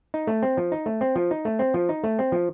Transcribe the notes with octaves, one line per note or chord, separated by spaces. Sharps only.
D#4
A3
C4
F3
D#4
A3
C4
F3
D#4
A3
C4
F3
D#4
A3
C4
F3